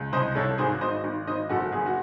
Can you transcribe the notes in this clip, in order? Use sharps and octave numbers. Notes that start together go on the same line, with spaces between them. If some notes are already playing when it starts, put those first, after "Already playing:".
Already playing: C#2
C2 C5 D#5
C2 A4 C#5
G#1 G#4 C5
G#1 C5 D#5
G#1
G#1 C5 D#5
F#1 F#4 A4
F#1 G#4
F#4